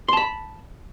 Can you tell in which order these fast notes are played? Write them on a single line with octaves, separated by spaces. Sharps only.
C6 A5 B5